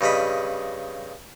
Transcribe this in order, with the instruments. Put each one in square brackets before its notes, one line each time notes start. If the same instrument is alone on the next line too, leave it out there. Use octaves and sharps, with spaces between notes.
[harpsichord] G2 C#3 D#5 B5